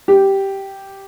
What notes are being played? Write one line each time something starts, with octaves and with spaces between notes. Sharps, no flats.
G4